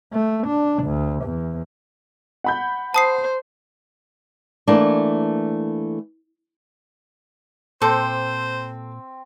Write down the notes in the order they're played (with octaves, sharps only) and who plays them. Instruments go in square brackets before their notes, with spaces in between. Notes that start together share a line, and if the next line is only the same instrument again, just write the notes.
[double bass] A3
D4
D2
E2
[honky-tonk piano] F#5 B5 G6
[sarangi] C5 [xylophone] A5 D#6 C7
[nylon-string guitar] E3 A3 A#3 D4
[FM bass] A#2 [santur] C4 [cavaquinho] A4 D6 [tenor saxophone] C5